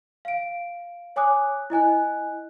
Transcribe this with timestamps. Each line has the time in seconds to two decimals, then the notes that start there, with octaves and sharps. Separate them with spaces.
0.25 F5 D7
1.16 C#5 G#5 D6 D#6 F#6
1.70 E4 D#5 G#5 F#6